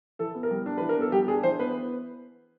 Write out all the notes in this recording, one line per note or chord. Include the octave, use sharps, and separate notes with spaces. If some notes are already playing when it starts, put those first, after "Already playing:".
E3 A4
B3
A#4
G3
D4
B4
E3
A#4
B3 A4
G3 G4
D4 G#4
E3 C5
B3 B4